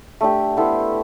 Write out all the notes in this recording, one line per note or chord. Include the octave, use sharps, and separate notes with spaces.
A3 D4 G4
B3 E4 A4 C5